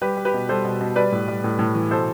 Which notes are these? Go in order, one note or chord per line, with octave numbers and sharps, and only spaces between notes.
G3 G4 B4
G3
G4 B4
B2
G3 A4 C5
B2
B2
G3 B4 D5
A2
G3
A2
A2
E3
B2 A4 C5